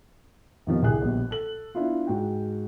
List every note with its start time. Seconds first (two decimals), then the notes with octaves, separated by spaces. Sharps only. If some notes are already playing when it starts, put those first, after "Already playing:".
0.67 F2 B2 D#3 F3 G3
0.82 D1 C2 G4 G#4 F#6
1.02 A#1 B2 G3
1.31 A4 F#7
1.75 B3 D4 E4 F4
2.07 G#2 F#4 G5